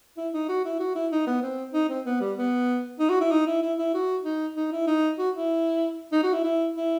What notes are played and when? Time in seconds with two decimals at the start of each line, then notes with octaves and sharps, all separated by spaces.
0.17 E4
0.34 D#4
0.49 F#4
0.65 E4
0.80 F#4
0.96 E4
1.12 D#4
1.27 B3
1.42 C4
1.74 D#4
1.89 C4
2.06 B3
2.21 G3
2.37 B3
3.00 D#4
3.09 F#4
3.21 E4
3.31 D#4
3.46 E4
3.62 E4
3.78 E4
3.94 F#4
4.24 D#4
4.56 D#4
4.72 E4
4.87 D#4
5.19 F#4
5.35 E4
6.12 D#4
6.23 F#4
6.33 E4
6.44 E4
6.76 E4